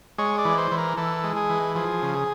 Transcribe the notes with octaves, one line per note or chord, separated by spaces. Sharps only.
G#3 C#5
D5
E3
C5
E3
A#4
E3 A4
G#3
G#4
E3
F3 G#4
C#3
G#4